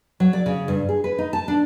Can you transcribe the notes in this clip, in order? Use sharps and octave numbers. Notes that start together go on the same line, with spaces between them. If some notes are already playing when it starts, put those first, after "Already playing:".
F#3
D5
C#3
G2
G#4
B4
D#4
A5
D4